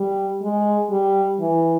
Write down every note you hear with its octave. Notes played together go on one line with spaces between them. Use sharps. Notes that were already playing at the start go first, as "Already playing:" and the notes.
Already playing: G3
G#3
G3
E3